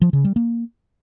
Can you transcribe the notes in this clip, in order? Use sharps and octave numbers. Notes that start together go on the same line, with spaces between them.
F3
C#3
G3
A#3